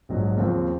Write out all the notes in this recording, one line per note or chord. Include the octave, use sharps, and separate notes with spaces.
A#1 G#2 F#3
D#2 C#3 F3 C4